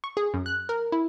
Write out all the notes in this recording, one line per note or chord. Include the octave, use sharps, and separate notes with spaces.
C#6
G#4
F#2
F#6
A#4
E4